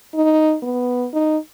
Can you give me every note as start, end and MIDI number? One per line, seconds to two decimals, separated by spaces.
0.14 0.56 63
0.63 1.06 59
1.13 1.37 63